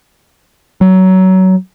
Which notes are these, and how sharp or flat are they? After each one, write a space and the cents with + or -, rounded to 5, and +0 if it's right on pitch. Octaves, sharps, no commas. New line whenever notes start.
F#3 +20